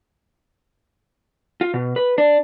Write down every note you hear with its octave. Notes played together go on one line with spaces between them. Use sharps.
F4
B2
B4
D4